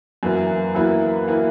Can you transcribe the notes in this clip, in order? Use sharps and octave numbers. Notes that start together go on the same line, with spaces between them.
F#2 E3 A#3 E4 B4
F#2 E3 A#3 E4 B4
E3 A#3 E4 B4